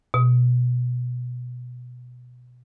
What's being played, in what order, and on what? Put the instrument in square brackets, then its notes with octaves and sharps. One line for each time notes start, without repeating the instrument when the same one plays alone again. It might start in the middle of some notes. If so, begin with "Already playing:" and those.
[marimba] B2